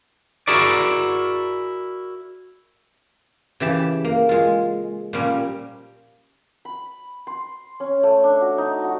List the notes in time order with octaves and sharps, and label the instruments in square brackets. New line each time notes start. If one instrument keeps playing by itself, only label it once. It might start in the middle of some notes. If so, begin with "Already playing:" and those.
[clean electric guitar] E4 F#4 G#4 A#4 D5
[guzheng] C#3 E3 G4 A5
A#3
G#3 F4
A#2 F3 G3 C#4 A#4
[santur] B5
C6
C#4
A3
D4
F#4
D#4
F#4